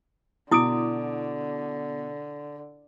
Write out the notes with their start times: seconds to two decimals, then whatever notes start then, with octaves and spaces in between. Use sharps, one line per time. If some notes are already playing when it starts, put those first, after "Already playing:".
0.52 B2 D3 E4 D6 D#6 D7